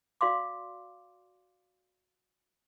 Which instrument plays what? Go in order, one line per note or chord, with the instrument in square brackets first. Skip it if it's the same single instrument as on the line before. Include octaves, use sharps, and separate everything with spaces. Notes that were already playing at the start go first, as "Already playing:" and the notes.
[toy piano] F#4 D5 F5 C6 D6